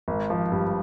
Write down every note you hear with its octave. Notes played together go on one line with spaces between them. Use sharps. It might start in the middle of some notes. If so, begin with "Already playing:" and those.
G#1
F3
G2